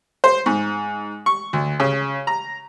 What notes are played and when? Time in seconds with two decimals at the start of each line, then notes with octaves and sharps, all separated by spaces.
0.24 C5
0.46 G#2
1.26 C#6
1.53 D2
1.80 C#3
2.27 A#5